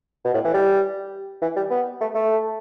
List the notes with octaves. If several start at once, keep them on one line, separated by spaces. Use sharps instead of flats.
B2
A2
E3
G3
E3
G3
B3
A3
A3